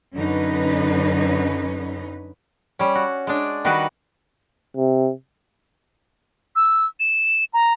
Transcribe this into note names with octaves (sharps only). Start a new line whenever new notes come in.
F#2 D3 C#4 D#4 B4
G3 C#4
F#4
G#3 D4
D#3 G3 D#4 F#4 B4
C3
E6
E7
A#5